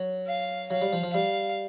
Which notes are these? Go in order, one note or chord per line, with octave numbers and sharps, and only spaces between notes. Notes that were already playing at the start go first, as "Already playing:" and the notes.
Already playing: F#3
F5
F#3 F5
G3
F3
F3
G3 F5